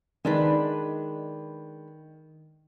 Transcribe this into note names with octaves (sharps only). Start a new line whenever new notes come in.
D#3 G#3 D4 B4